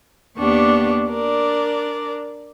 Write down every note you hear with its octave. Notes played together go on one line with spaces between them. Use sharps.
D#2 A#3 B3 D4 G4 C#6
D4 A#4 D5